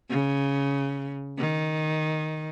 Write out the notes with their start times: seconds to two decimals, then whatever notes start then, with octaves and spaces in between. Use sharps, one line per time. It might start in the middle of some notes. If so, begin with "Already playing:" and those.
0.10 C#3
1.39 D#3